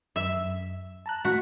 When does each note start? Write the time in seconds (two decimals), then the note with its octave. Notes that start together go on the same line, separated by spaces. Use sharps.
0.16 F#2 E5
1.06 A5 A#5 F#6
1.25 A2 F#4 B6